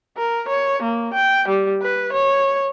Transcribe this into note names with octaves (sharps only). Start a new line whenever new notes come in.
A#4
C#5
A#3
G5
G3
B4
C#5